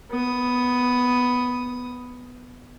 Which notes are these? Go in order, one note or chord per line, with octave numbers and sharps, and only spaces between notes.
B3 D#6